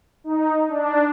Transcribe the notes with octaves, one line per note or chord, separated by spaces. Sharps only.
D#4
D4